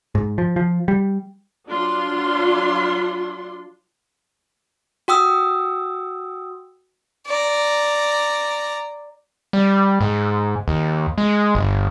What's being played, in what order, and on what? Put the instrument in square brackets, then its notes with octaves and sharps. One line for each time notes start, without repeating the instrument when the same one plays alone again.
[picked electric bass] G#2
F3
F3
G3
[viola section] F#3 D4 F4 C6
[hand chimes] F#4 G5 D#6 E6
[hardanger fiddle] D5 A#5
[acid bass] G3
G#2
D#2
G#3
G1